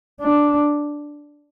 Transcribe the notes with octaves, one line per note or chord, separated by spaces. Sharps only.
D4